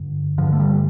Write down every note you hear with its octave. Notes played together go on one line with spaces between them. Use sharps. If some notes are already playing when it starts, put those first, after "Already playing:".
Already playing: G2 D3
G2 D3 F3
A3
G3